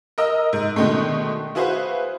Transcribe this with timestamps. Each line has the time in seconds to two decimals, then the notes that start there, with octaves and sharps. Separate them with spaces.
0.18 A#4 D#5 E6
0.53 G#2
0.76 B2 D3 D#3 G#3 A3
1.55 E4 F#4 G#4 B4 C5 F5